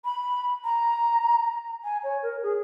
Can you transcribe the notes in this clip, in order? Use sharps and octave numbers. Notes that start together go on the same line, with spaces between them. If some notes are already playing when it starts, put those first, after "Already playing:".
B5
A#5
G#5
C#5
A#4
G#4